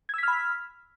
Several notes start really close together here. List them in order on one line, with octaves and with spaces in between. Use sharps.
G#6 E6 B6 F6 B5